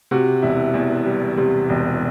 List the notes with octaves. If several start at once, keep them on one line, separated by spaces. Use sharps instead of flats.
C3 F#4
E1 E4
E2
G3
C3
E1